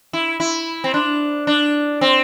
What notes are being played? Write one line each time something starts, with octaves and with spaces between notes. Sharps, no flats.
E4
E4
C4
D4
D4
C4